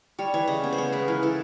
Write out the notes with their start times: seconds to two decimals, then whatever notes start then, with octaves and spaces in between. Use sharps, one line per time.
0.19 G3 C#5
0.34 E3 C#5
0.47 C#3 D#5
0.63 B3
0.73 C5
0.78 B3 C#5
0.92 G#3 B4
1.08 E3 A#4
1.23 E3 A4